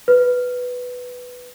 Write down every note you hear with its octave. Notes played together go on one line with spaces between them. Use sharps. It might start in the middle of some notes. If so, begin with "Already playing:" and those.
B4